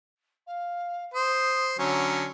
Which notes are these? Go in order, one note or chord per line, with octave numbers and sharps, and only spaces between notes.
F5
C5 D#6
D3 F#3 C#4 A#5